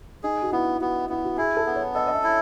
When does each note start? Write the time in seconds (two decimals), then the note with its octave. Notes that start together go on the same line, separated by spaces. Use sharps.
0.23 D#4 G#4
0.42 F#4
0.52 B3 E4
0.81 B3 F#4
1.09 B3 E4
1.24 F#4
1.38 E4 G#4
1.57 A4
1.66 B3
1.76 C#5
1.95 A4 D#5
2.07 D#5
2.14 E5
2.24 E4